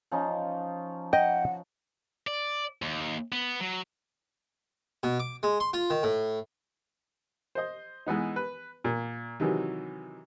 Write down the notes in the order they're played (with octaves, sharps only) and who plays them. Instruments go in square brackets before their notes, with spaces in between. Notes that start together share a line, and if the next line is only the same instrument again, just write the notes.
[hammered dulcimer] F3 C#4 D#4
[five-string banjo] D#5 [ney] F#5 [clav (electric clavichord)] G5
[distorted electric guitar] D5
D#2
B3
F#3
[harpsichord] B2
D6
G#3
C6
F4
D#3
A2
[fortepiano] C5 D#5
E3 G#3 B3 D#4
B4
A#2
C3 D#3 E3 F#3